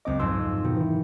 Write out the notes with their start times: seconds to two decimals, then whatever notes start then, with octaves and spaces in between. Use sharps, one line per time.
0.05 F#1 C#2 C4 D#5 D6
0.19 F2 G#2 C6 E6
0.64 B2 D#3
0.77 E3 E4